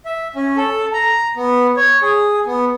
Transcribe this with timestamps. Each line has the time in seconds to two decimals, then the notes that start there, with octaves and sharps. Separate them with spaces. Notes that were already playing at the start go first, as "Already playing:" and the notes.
0.05 E5
0.36 C#4
0.57 A4
0.93 A#5
1.36 B3
1.77 C#5
2.02 G#4
2.46 B3